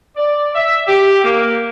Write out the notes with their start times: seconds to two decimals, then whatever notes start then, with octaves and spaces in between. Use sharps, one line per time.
0.16 D5
0.54 E5
0.87 G4
1.23 A#3